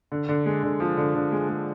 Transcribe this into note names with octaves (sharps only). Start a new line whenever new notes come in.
D3
D3
G#3
D3
F3
D3
D3
G#3
G#3